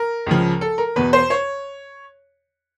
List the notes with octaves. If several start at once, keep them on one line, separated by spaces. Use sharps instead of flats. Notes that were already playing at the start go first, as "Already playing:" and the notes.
Already playing: A#4
C#2 C#3 F3
A4
A#4
E2 B2 B4
C5
C#5